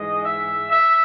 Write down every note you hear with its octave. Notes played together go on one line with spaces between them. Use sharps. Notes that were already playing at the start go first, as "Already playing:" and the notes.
Already playing: G#2 E3 G#3 D#5
E5
E5